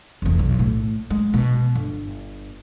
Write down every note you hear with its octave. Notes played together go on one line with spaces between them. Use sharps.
F1 E2
B1
A2
G#3
B2
G1